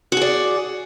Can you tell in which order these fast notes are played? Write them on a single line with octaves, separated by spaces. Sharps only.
F#4 G#4 D5